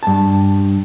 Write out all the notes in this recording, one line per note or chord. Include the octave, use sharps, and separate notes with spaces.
G2 A5